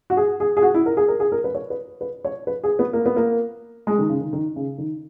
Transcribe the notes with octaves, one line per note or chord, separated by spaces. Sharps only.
F#4
G#4
G#4
G#4
F#4
E4
A#4
G#4
A#4
G#4
A#4
B4
C#5
B4
B4
C#5
B4
G#4
B3
A#3
B3
A#3
G#3
D#3
C#3
D#3
D#3
C#3
D#3